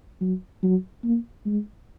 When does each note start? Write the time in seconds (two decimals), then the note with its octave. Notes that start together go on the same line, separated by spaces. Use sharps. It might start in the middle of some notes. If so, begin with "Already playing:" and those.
0.21 F#3
0.63 F#3
1.04 A#3
1.46 G#3